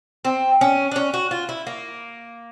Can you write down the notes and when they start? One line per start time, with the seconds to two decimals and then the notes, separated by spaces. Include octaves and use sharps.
0.25 C4
0.61 C#4
0.91 D4
0.96 C#4
1.14 F#4
1.31 F4
1.49 E4
1.67 A#3